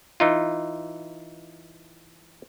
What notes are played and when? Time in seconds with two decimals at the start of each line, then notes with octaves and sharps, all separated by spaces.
0.20 E3 D#4 F4